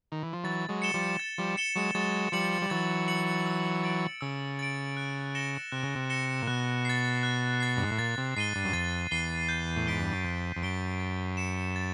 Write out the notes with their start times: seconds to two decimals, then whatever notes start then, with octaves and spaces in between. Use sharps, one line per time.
0.12 D#3
0.23 E3
0.33 F3
0.44 E3 F#3 A6
0.69 F#3 G#3
0.82 C#7 E7 G7
0.94 F3 G3
1.20 A6
1.38 F3 G3
1.57 C#7 E7 G7
1.76 F#3 G#3
1.95 F#3 G#3 A6
2.32 F3 G3 C#7 F#7
2.62 G3
2.70 E3 F#3 A6
3.08 C#7 F#7
3.46 E6
3.83 A6 D7
4.21 C#3 E6
4.59 A6 D7
4.97 F#6
5.35 A#6 C#7 E7 G7
5.72 C3 F#6
5.83 C#3
5.95 C3
6.10 A#6 C#7 E7 G7
6.42 A#2
6.47 B2 F#6
6.85 A6 C7
7.23 F#6
7.60 A6 C7
7.77 G2
7.83 G#2
7.91 A2
7.98 A#2 A6
8.18 C3
8.36 G#2 C7 D#7 G7
8.55 G2
8.64 F#2
8.73 F2 A6
9.11 E2 C7 D#7 G7
9.49 G6
9.76 A2
9.87 G#2 B6 D7 G7
10.01 G2
10.13 F#2
10.25 F2 G6
10.56 F2
10.62 F#2 B6 D7 G7
11.00 A6
11.37 C#7 E7
11.76 A6